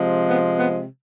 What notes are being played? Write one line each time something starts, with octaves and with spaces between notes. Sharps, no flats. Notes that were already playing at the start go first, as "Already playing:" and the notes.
Already playing: C3 F3 G#3
B3
B3